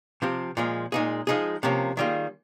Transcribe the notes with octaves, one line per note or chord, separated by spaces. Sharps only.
C3 F3 C4 G4
A#2 F3 G#3
A#2 G#3 D#4 G#4
F3 G#3 D#4 G#4
C3 F3 A#3 C#4
D#3 G3 A#3 F4 G#4